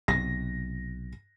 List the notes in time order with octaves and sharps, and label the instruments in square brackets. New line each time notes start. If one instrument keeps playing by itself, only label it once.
[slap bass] B1 C3 [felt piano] A#6